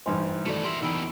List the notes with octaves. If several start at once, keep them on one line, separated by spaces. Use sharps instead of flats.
A1 G2 D#4 C5 G#5 C6
D#3 A3 F#4 A4 D5
G4 A#4 E5 C6 F#7
E2 B2 D#3 D#4 B5 E6 D7